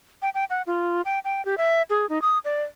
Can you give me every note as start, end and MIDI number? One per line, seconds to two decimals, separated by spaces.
0.22 0.30 79
0.34 0.45 79
0.50 0.62 78
0.67 1.02 65
1.05 1.19 79
1.25 1.44 79
1.45 1.57 67
1.58 1.82 76
1.90 2.08 68
2.09 2.21 63
2.22 2.38 87
2.45 2.63 74